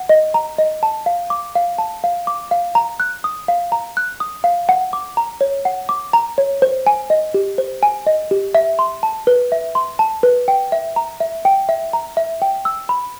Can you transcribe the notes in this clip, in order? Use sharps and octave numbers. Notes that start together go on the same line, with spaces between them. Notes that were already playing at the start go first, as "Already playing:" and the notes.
Already playing: F#5
D#5
A#5
D#5
A5
F5
D6
F5
A5
F5
D6
F5
A#5
F#6
D#6
F5
A#5
F#6
D#6
F5
F#5
D6
A#5
C#5
F#5
D6
A#5
C#5
C5
G#5
D#5
G4
C5
G#5
D#5
G4
E5
C6
A5
B4
E5
C6
A5
B4
G5
E5
A#5
E5
G5
E5
A#5
E5
G5
E6
B5